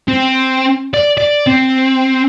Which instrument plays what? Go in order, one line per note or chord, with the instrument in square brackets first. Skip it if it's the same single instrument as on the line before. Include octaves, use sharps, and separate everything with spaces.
[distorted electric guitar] C4
D5
D5
C4